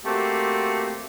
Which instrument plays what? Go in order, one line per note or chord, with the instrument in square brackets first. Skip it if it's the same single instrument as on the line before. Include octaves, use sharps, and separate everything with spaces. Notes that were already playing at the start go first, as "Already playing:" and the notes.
[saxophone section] A3 A#3 C4 F#4 G4